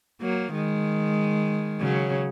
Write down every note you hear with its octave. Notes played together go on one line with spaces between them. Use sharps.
F#3 A#3
D#3 G#3
C#3 F#3